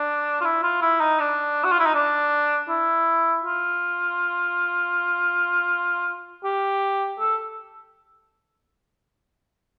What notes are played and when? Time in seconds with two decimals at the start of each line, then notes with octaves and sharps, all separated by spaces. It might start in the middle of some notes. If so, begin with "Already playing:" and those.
Already playing: D4
0.41 F4
0.44 E4
0.63 F4
0.82 E4
1.00 D#4
1.20 D4
1.64 F#4
1.71 F4
1.79 E4
1.86 D#4
1.94 D4
2.69 E4
3.44 F4
6.44 G4
7.19 A4